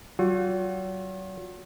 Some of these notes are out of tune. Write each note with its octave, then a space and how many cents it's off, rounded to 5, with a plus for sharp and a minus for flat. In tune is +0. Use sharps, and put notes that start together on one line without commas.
F#3 +40 F4 +45